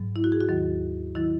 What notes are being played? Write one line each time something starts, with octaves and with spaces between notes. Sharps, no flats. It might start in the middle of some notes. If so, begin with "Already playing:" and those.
Already playing: G#2 F#3
E4
F#4
G#4
F#4
D#2 D#3 F#3
D#3 F#3 E4